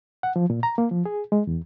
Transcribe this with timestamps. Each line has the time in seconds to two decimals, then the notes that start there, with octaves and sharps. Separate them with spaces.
0.23 F#5
0.36 F3
0.50 A#2
0.63 A#5
0.78 A#3
0.91 F3
1.06 G#4
1.32 G#3
1.47 E2